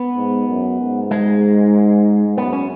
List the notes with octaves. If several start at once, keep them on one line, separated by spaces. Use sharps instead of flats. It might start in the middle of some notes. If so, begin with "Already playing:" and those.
Already playing: B3
G#2
F#2
G#2
G#3
F#2 B3
C#4